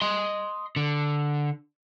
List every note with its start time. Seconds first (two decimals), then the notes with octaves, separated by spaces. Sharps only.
0.02 D#5 C6
0.76 D3